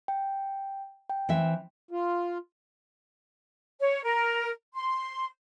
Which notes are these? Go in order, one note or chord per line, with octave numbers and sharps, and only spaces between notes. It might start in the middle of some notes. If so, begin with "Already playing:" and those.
G5
G5
E3 C4 E5
F4
C#5
A#4
C6